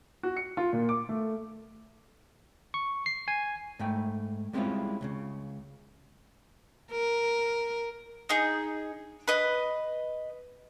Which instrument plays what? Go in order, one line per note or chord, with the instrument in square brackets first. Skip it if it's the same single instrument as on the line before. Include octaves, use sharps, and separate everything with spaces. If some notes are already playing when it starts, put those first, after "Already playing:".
[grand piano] F#4
C#7
F4
A#2
D6
A3
[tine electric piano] C#6
C7
G#5
[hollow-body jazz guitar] G#2 A3 G5
G3 G#3 C4 C#4 E4 F4
C#2 A2 C#3
[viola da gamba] A#4
[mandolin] D#4 G#4
B4 D#5